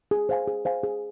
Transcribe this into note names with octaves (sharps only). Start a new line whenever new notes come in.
G#4
C5 F5 G#5
G#4
C5 F5 G#5
G#4